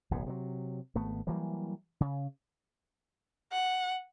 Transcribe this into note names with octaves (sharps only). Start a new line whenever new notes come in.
D1 B1 F#2 B2
C3 D#3 F#3
G#1 A3 B3
E3 F#3 G3 A#3
C#3
F#5